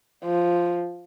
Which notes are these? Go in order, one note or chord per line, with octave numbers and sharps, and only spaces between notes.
F3